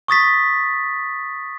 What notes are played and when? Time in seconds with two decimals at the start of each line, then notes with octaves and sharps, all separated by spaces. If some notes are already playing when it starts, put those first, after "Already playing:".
0.08 C#6 D#6 A6 B6